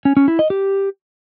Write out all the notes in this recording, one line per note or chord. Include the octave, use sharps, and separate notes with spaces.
C#4
C#4
E4
D#5
G4